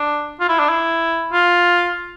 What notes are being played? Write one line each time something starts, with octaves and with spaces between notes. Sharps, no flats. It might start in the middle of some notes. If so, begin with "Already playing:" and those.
Already playing: D4
F4
E4
D4
E4
F4